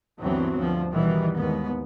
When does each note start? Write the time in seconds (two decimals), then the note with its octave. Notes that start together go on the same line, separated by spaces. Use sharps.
0.21 D2 G2 E3 F#3 B3 C4
0.57 D2 G2 F3
0.92 B2 D#3 E3 G3 B3
1.36 D#2 G#2 B3